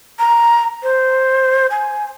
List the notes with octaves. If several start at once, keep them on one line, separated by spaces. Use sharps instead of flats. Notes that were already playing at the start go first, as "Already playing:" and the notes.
A#5
C5
G#5